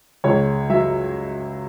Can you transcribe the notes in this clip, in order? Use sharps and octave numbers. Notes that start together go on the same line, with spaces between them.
C#2 C#5
F#3 E5